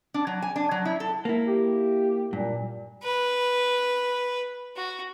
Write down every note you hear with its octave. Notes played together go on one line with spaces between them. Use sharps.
D4
F#3
G#5
D4
F#3
E4
A4
A#3 E4
G4
G2 A#2
B4
F#4